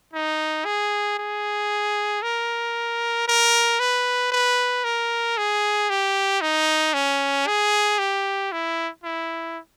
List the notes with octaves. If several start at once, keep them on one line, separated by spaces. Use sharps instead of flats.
D#4
G#4
G#4
A#4
A#4
B4
B4
A#4
G#4
G4
D#4
C#4
G#4
G4
E4
E4